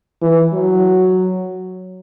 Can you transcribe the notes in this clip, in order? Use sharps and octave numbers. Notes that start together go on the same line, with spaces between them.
E3
F#3